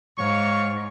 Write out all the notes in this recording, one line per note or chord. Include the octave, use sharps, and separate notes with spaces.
G#2 C#5 F5 C#6